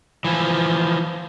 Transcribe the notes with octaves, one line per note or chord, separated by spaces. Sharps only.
E3 F3